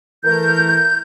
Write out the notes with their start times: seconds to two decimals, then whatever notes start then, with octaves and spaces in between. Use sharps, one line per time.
0.24 E3 A3 A#4 G6